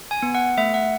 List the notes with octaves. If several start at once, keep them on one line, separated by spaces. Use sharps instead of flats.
G#5
B3
F#5
A3 E5
F#5